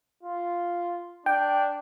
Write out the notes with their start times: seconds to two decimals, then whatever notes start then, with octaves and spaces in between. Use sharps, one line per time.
0.23 F4
1.26 D4 G5